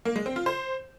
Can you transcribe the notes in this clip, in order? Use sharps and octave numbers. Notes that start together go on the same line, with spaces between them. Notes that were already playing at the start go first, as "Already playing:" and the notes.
A#3
G#3
C4
F4
C5